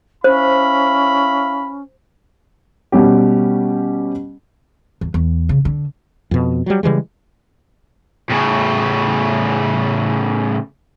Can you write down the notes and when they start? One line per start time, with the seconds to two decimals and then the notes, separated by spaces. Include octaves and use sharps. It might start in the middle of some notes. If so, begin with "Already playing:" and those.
0.24 C#4 E4 C5 F5 B5
2.92 B2 G3 C#4 G4
5.01 E2
5.14 E2
5.49 C#3
5.65 D3
6.31 F2 B2
6.66 F#3 G3
6.83 C#3 E3 G3 G#3
8.30 A2 C#3